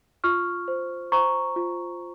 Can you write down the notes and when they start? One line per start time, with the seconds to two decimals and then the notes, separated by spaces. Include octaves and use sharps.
0.24 F4 C#6 F6
0.68 C5
1.12 C5 A#5 C#6
1.56 F4